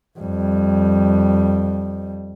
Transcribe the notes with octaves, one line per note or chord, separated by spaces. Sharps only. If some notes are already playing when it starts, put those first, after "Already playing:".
F2 G3